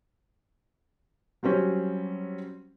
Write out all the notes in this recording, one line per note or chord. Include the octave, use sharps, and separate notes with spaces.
F#3 G3 C4 C#4